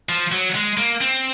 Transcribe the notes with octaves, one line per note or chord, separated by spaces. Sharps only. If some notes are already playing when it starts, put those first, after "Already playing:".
F3
F#3
G#3
A#3
C4